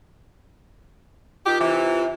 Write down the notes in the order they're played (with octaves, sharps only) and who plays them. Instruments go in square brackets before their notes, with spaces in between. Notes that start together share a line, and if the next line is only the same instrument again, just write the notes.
[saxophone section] D#3 D#4 G4 [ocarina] F4
[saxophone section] C3 E3